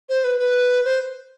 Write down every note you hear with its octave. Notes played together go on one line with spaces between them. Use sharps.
C5
B4
B4
C5